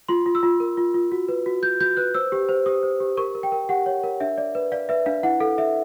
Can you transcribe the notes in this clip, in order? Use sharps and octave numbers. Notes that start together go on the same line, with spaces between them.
F4 C6
F4
E6
F4
A#4
F4
F4
F#4
B4
F#4
F#4 G6
F#4 G6
B4 F#6
C5 E6
G4
C5
G4 D#6
C5
G4
A#4 C#6
A#4
G5
A#4
G4 F#5
C#5
A#4
D4 E5
D5
B4
D5 F5
B4 E5
D4 F5
E4 F#5
A4 F5
A4 E5